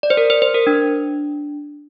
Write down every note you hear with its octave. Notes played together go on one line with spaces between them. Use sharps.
D5
C5
A#4
C5
C5
A#4
D4